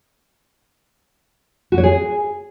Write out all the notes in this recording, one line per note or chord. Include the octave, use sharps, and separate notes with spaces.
F#4
C#5
G#4